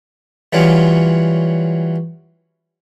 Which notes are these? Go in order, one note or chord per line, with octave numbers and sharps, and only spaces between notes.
E3 F#3 G3 C#4 F4